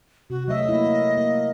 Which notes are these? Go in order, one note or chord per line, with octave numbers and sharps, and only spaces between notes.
C3 F#4
F#3 A3 D#5 E5
A#3 E4
A#3